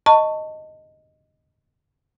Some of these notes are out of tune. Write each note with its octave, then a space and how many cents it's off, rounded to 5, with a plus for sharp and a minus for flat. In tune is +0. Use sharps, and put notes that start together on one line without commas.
D#5 +0 A5 +25 C#6 +0